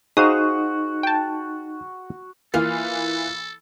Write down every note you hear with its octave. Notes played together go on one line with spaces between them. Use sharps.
D#4 F#4 G#4 C5 F5 D#6
G5 A5
E3 A#3 F4 A4